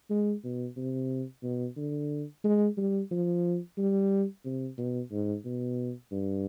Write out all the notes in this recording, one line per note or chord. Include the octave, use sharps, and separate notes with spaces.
G#3
B2
C3
B2
D3
G#3
G3
F3
G3
C3
B2
G#2
B2
G2